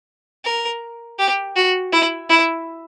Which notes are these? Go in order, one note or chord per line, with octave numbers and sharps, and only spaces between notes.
A#4
G4
F#4
E4
E4